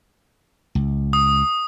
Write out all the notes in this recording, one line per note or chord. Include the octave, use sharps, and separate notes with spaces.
C#2
D#6